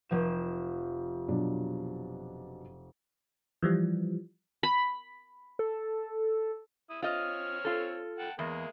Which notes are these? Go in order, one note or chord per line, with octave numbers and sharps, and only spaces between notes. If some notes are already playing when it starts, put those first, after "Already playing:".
F1 F3 E7
B2 F#3 D4
E3 F3 G3
B5
A4
E4 D#6
C4 F4 C#5 D#5 F6
F4 A4
F#5 G5 A5
E2 G#3 A#3